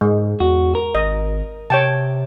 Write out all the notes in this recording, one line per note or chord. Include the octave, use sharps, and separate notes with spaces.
G#2 G#3
E2 F#4
A#4
G#1 D#5
C3 C#5 G5 A5